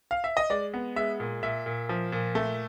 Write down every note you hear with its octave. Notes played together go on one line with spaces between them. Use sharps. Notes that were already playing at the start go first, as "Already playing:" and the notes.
F5
E5
D#5
G#3 D5
B3
G#3 E5
A#2
A#2 E5
A#2
F3
A#2
A3